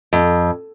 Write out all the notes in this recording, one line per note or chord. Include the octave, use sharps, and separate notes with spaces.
F2